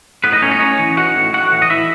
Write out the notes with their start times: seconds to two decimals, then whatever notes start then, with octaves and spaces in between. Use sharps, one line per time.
0.24 A2 B3 B4
0.32 D#4 D#5
0.42 A2 C#4 C#5
0.51 D#4 D#5
0.60 B3 C#4 C#5
0.79 E3
0.97 D#4 F#4 F#5
1.15 A2
1.33 A2 F#4 F#5
1.52 E3
1.62 D#5
1.70 E3 E4 E5